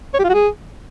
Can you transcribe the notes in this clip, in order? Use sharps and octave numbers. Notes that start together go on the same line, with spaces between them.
C#5
G4
F4
F#4
G#4